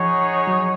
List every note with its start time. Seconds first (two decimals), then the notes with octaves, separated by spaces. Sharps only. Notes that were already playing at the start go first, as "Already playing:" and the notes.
Already playing: F3 D#4 G#4 C#5 F#5
0.47 F#3